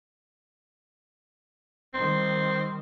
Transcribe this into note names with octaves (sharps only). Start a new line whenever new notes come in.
D#3 G3 C4 C6